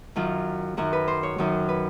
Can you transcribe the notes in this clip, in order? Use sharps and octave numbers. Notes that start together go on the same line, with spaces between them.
F#2 D#3 F#3 F4
F#2 D#3 F#3 F#4
B4
C5
C#5
F#2 D#3 F#3
B4